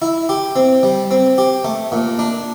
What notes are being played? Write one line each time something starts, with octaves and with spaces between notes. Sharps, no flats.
E4
G4
C4
G3
C4
G4
A3
A#2
D4